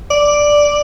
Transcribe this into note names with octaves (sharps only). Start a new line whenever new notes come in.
D5